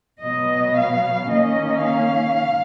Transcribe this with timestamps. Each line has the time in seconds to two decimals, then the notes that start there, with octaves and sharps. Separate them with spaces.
0.22 B2 F#3 B3 D#5
0.76 F5
1.30 D#3 A#3 C#4 D#5
1.84 F5